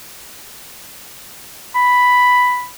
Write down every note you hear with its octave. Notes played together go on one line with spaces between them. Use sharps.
B5